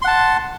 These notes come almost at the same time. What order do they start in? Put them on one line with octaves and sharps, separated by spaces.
C6 F#5 A5